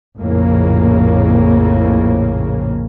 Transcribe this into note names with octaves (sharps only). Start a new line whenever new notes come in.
A#1 F2 A2 C#3 A#3